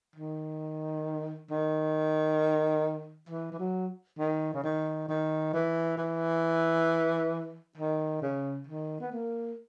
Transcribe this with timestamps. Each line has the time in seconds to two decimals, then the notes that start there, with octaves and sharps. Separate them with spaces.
0.16 D#3
1.50 D#3
3.29 E3
3.52 E3
3.59 F#3
4.19 D#3
4.54 C#3
4.63 D#3
5.08 D#3
5.53 E3
5.97 E3
7.77 D#3
8.22 C#3
8.67 D#3
9.00 B3
9.12 A#3